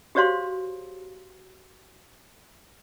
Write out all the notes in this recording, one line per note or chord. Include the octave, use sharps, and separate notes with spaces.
F#4 G4 C5 C#5 F5 C6